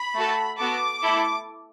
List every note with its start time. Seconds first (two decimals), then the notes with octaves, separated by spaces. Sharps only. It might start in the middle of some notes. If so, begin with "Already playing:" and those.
Already playing: B5
0.15 A3 F#4 A4
0.59 B3 F#4 A4 D6
1.02 A3 E4 A4